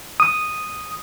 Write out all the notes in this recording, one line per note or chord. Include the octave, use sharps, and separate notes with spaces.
D#6